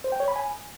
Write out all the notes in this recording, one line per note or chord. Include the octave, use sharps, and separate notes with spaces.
C5
G5
C#5
B5
G#5